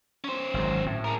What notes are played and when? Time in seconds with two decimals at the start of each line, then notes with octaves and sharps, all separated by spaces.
0.24 C#4 C5
0.54 G#1 F#3
0.86 A2
1.04 G#4 A#4